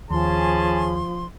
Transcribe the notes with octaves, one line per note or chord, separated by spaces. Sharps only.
D#2 F3 C#4 G#4 A5 C6